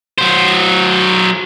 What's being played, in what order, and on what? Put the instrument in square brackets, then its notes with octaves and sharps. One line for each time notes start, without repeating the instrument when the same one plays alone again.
[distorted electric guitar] F#3 C5